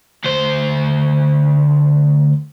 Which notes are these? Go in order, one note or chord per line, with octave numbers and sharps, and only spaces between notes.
D2 C5